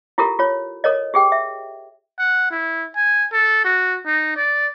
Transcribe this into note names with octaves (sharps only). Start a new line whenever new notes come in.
E4 F4 G4 A4 A#4
F4 C#5
A4 A#4 C#5 D#5
G4 G#4 G5
E5
F#5
E4
G#5
A4
F#4
D#4
D5